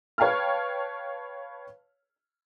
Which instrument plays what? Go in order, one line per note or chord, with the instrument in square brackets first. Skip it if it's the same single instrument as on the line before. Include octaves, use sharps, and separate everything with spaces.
[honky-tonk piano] B4 C#5 F5 G5 A5 F6